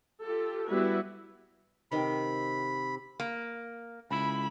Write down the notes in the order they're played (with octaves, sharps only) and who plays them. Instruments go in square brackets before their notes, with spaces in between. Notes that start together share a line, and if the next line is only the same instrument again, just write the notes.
[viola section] F4 G4 A4
G3 B3 E4 F#4 B4
[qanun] C3 D#3 G5 [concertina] B5
[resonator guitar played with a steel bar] A#3
[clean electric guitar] C#2 E4 [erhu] B5